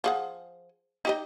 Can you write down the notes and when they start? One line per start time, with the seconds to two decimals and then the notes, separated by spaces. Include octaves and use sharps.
0.04 F3 G#4 F#5
1.05 D#4 G4 D#5